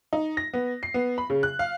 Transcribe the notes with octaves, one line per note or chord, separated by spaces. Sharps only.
D#4
A#6
B3
C7
B3
B5
C#3
F#6
F5